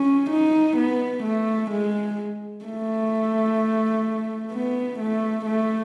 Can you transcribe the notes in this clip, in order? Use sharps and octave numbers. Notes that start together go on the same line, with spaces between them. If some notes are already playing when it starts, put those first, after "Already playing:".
Already playing: C#4
D#4
B3
A3
G#3
A3
B3
A3
A3